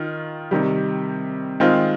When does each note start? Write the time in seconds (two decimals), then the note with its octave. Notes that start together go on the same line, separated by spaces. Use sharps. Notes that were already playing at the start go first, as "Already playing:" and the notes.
Already playing: D#3 F4
0.51 C3 D#3 G3
1.60 D#3 G#3 C4 F4